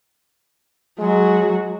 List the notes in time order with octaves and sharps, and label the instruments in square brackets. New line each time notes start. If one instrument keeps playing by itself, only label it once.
[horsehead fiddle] F#3 F#4 [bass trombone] G#3